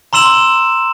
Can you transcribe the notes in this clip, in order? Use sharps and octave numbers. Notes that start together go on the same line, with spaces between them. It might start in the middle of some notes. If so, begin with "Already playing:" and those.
A#5 C6 E6 E7 F#7